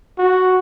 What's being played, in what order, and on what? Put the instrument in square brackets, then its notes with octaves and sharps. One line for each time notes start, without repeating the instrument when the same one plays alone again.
[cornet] F#4